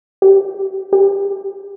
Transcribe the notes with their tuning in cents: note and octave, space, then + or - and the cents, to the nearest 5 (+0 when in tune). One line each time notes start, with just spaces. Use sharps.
G4 +5
G4 +40